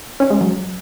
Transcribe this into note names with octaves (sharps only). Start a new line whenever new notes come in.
C#4
G#3
F#3